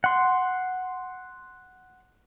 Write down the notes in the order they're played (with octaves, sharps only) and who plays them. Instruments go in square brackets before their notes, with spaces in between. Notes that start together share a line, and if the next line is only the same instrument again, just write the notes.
[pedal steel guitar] F#5 C6